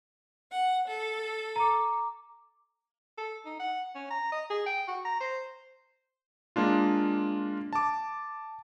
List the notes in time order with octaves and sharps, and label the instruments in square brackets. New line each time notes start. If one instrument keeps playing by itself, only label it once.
[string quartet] F#5
A4
[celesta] A#5 D6
[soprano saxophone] A4
D#4
F#5
C#4
A#5
D#5
G#4
G5
F#4
A#5
C5
[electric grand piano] G#3 A#3 D4 F4
A5 D6